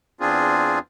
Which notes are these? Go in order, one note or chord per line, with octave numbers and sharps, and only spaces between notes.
E2 C4 D4 F4 G#4